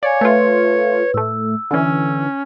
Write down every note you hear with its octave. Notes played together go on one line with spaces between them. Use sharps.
C#5 D5 F5 G#5
A3 F4 B4
A2 A3 E6
D3 E3 C#4